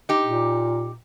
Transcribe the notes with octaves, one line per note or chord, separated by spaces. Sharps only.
D#4 G4
A#2